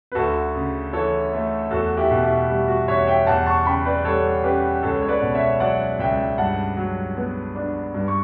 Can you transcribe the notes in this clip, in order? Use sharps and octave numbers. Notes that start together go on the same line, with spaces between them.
B4
D2 F#4 A4
C#3
E3 A4 C#5
A3
E2 F#4 A4
E4 G4
B2
E4 G4
G3
F#4
E2 C#5 E5
E5 G5
E2 F#5 A5
A5 C#6
C#3 G5 B5
B4 D5
G3 A4 C#5
C#4 G4 B4
C#2 A4 C#5
C#5
B4 D5
B2
C#5 E5
F#3 D5 F#5
C#2 E5 G5
G2 F#5 A5
F#3
B3
D4
G2
C#6